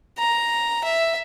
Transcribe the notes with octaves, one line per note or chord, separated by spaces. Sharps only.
A#5
E5